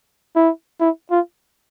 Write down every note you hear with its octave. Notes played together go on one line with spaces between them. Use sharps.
E4
E4
F4